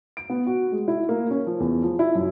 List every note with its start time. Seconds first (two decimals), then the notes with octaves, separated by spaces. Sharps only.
0.17 D7
0.30 B3
0.47 F#4
0.72 G#3
0.88 E4
1.09 A#3
1.31 C#4
1.47 F3
1.60 E2
1.83 F3
1.99 E4
2.15 F#2